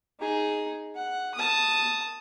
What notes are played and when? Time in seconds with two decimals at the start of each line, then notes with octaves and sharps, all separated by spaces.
0.20 D#4 G#4
0.95 F#5
1.35 A5 D#6